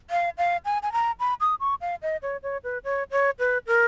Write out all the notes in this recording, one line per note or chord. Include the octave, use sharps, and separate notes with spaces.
F5
F5
G#5
G#5
A#5
B5
D#6
C#6
F5
D#5
C#5
C#5
B4
C#5
C#5
B4
A#4